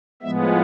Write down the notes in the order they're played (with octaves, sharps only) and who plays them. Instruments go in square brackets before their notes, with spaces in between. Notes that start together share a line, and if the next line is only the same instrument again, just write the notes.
[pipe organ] A2 F3 G#3 B3 E5